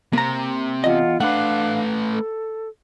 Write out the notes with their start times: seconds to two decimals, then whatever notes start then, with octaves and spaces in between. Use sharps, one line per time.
0.13 C3 A#3 A#5
0.84 E2 F4 D#5 F#5
1.20 A3 D4 B4 F5 F#5 F#6
2.12 A4